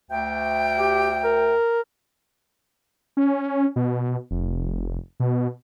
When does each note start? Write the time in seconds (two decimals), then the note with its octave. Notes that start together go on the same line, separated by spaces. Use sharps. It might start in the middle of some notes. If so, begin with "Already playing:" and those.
0.11 D2 G5
0.79 G4
1.24 A#4
3.17 C#4
3.76 B2
4.31 F1
5.20 B2